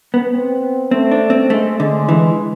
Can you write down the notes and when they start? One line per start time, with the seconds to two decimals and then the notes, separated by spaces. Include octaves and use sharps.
0.14 B3
0.33 C4
0.91 A3 C4
1.11 D4
1.30 C4
1.50 G#3 A3
1.79 D3 G#3
2.09 E3